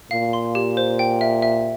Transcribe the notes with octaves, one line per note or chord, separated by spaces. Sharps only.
A#2 F5
C6
G4
C5
G5
E5
E5